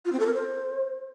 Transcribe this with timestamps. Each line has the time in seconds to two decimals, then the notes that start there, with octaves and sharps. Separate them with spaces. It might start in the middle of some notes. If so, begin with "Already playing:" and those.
0.05 F4
0.12 C4
0.20 A4
0.27 A#4
0.34 C5